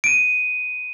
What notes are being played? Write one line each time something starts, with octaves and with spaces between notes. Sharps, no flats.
D7 D#7